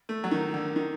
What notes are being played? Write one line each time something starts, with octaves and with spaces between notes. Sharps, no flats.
A3
F#3
D#3
D3
D#3